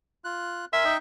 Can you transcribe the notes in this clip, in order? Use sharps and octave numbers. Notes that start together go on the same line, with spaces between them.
F4 F#6
A#4 E5 G#5 C6
D#4 D#5 G5